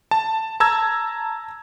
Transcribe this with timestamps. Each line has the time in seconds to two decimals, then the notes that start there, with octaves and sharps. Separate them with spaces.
0.11 A5
0.60 A5 A#5 E6 G#6